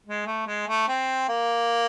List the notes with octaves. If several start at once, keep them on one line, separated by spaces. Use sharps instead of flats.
G#3
A3
G#3
A3
C4
A#3